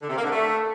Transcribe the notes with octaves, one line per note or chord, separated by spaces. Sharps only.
D3
C3
A#3
D3
A3